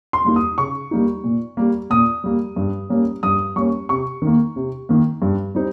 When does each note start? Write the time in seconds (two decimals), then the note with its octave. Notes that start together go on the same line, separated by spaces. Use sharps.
0.13 C6
0.25 G3 A#3 D#4
0.36 D#6
0.58 C#3 C#6
0.91 G3 A#3 D#4
1.24 A#2
1.57 G3 A#3
1.90 A#2 D#6
2.24 G3 A#3
2.56 G2
2.89 G3 A#3 C#4
3.23 G2 D#6
3.56 G3 A#3 C#4 C#6
3.89 C3 C#6
4.22 D#3 A#3
4.56 C3
4.89 D#3 A#3
5.22 G2
5.55 G3 C4 D#4